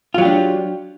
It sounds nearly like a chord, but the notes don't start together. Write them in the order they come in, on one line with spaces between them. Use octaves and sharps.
F4 F#3 G4 D4